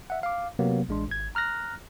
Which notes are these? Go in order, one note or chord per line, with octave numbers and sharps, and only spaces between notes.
E5 F#5
F5 D6
C3 F#3 A#3 B3
A1 G#3 D4 C6
G#1 G#6
A#5 F6 F#6 A#6